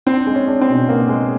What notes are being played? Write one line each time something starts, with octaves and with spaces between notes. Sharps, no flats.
C4 D4
G#3
C#4
D4
C4
B2
A#3 B3
G#3